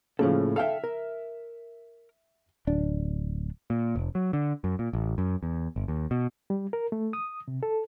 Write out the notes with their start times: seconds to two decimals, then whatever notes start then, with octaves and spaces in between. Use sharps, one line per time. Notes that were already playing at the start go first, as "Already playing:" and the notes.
0.19 A2 C#3 F3 A#3 A4
0.56 A4 E5 F5 G5 F6
0.84 A#4
2.67 D1 D4
3.70 A#2
3.96 F1
4.15 F#3
4.33 D3
4.64 F#2
4.79 A#2
4.93 A1
5.18 F#2
5.43 E2
5.76 G1
5.88 D#2
6.11 B2
6.50 G3
6.73 A#4
6.92 A3
7.13 D#6
7.48 C3
7.63 A4